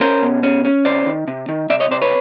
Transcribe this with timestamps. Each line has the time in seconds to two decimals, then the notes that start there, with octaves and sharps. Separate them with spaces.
0.01 C#4 A#4 C5
0.22 B2
0.43 C#4
0.65 C#4
0.85 C3 C5 D5
1.06 D#3
1.28 C3
1.49 D#3
1.70 C3 D5 E5
1.80 C#5 D#5
1.91 C3 C5 D5
2.02 B4 C#5